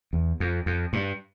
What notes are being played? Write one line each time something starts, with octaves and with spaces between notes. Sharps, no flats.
E2
F2
F2
G2